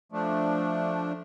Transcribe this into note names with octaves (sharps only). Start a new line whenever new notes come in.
F3 A3 D4